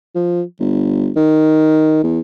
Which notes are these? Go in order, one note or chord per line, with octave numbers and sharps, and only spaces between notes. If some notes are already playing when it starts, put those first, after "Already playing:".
F3
G1
D#3
E2